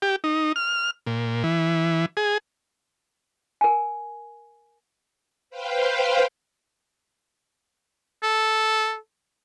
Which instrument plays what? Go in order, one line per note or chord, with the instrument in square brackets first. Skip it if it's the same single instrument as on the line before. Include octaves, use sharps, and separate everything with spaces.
[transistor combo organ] G4
D#4
F6
A#2
E3
G#4
[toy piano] A#4 G#5
[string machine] B4 C5 F5 G5
[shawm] A4